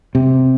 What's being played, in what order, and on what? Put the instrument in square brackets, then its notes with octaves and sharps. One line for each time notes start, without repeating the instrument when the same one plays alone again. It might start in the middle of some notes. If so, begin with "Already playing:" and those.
[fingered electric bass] C3